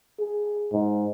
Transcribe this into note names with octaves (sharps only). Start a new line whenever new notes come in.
G#4
G#2